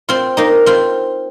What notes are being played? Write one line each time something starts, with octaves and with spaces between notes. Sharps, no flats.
C4 F4
A#3 D#4
C4 F4